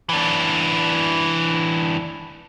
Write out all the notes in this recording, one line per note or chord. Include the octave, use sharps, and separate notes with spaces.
E3 D4